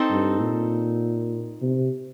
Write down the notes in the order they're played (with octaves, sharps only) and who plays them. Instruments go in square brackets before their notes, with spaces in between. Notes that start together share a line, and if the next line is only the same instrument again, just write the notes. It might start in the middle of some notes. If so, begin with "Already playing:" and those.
Already playing: [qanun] C4 D#4 A4
[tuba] G2
A#2
C3